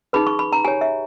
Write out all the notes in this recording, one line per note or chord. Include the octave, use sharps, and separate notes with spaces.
D#4 G#4 B4 B5
C#6
B5
A#5
G4 C#5 G#5
E5